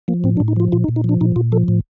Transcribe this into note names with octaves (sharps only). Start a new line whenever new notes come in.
F3 A#3
A2 C4
D4
A2
D#4
F3 F4
A#2 F4
D#4
A#2
D#4
F3 D4
A#2 D#4
A#2 F4
F3 A4
A2